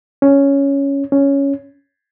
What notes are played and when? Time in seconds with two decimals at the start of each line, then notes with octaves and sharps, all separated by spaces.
0.22 C#4
1.12 C#4